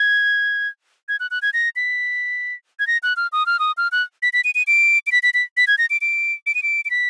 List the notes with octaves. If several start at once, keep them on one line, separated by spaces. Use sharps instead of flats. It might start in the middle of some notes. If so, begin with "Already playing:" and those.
Already playing: G#6
G#6
F#6
F#6
G#6
A#6
B6
G#6
A#6
F#6
F6
D#6
F6
D#6
F6
F#6
B6
B6
D#7
D#7
D7
D7
B6
B6
B6
B6
G#6
A#6
D7
D7
D7
D#7
D7
D7
B6